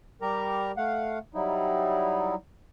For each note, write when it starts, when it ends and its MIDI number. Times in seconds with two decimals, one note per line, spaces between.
0.22 0.72 55
0.22 0.72 67
0.22 0.72 70
0.22 0.72 82
0.77 1.18 57
0.77 1.18 77
0.77 1.18 78
1.34 2.35 54
1.34 2.35 55
1.34 2.35 63
1.34 2.35 64